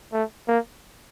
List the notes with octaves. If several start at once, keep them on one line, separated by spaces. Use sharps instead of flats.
A3
A#3